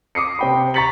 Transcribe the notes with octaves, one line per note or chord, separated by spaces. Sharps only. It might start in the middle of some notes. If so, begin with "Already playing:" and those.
D6 D#6 C7 C#7
C3 G5 B5
A#5 C#6 A6 B6 C#7 F#7